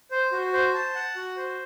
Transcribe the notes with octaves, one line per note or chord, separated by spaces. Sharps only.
C5
F#4
C5
A5
F#5
F#4
C5